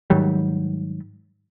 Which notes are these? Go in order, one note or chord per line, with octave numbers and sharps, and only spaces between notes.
G#2 D#3 F#3 G3